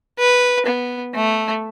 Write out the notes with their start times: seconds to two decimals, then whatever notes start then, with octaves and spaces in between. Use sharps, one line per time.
0.19 B4
0.66 B3
1.15 A3